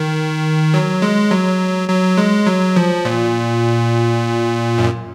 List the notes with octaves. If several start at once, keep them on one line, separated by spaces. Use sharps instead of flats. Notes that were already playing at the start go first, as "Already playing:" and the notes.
Already playing: D#3
F#3
G#3
F#3
F#3
G#3
F#3
F3
A#2
F#2